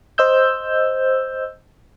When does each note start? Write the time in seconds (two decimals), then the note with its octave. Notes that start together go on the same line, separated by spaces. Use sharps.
0.18 C5 D#5 E6 G6